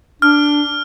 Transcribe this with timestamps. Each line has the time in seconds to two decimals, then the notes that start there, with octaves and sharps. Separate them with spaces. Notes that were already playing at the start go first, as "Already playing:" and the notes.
0.22 D4 F6